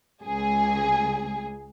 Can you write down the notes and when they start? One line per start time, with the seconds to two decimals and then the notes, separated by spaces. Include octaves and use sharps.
0.24 C#2 G#4